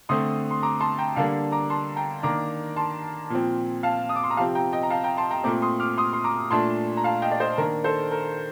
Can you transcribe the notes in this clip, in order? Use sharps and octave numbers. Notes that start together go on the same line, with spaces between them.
D3 A3 C4 C6 D#6
C6
A#5 D6
A5 C6
G5 A#5
D3 G3 A#3 D4 F5 A5
A#5 D6
A5 C6
G5 A#5
D#3 A#3 D4 A#5 D6
A5 C6
A#2 F3 C4
F5 A5
D#6
D6
C6
A#5
C3 F3 C4 F5 A5
G5 A#5
D#5 G5
A#5
F5 A5
G5 A#5
A5 C6
G5 A#5
A#2 A3 C4 A#5 D6
C6 D#6
D6 F6
C6 D#6
C6
A#5 D6
A#2 A3 D4 A5 C6
A#5
F5 A5
D#5 G5
D5
C5 D#5
D#3 A#3 D4 A#4
A4 C5
A#4